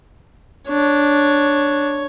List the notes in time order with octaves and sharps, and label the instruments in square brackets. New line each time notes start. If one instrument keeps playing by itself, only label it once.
[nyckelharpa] D4 [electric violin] C#5